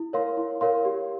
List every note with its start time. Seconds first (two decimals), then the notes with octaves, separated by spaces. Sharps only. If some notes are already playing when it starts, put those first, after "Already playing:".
Already playing: E4
0.13 A#4 C#5 F5 C6
0.37 E4
0.61 A#4 C#5 F5 C6
0.85 G4